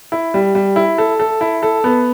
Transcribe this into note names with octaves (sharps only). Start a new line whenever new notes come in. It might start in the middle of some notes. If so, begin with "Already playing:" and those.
E4
G3
G3
E4
A4
A4
E4
A4
B3